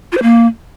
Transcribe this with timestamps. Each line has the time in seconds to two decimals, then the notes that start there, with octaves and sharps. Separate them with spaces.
0.12 F4
0.17 C5
0.22 A#3